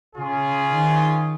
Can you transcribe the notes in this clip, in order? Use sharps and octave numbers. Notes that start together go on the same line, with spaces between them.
C#3 C#4 F4 G#4
D#3